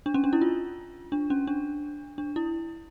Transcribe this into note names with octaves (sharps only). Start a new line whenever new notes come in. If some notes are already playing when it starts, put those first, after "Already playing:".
D4
C#4
D4
E4
F4
D4
C#4
D4
D4
E4